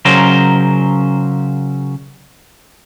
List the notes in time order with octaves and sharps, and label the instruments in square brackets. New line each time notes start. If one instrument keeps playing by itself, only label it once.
[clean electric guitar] C#3 F#3 C#4 A#4 C5